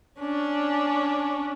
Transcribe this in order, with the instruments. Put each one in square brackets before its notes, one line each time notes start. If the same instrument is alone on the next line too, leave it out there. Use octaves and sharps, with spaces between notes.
[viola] C#4 D4